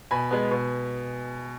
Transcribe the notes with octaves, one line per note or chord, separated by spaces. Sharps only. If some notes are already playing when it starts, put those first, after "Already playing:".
B2 G#5 B5
G#3 B3
B2